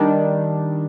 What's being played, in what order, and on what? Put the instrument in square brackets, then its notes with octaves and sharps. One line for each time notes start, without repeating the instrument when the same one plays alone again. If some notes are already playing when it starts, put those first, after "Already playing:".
Already playing: [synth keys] D#3 G3 D4